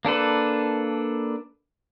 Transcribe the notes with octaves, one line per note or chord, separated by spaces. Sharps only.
A#3 D4 A4 B4